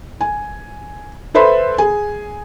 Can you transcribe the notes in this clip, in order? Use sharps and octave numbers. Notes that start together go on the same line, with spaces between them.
G#5
A4 B4 C5 E5 B5 C6
G#4 G#5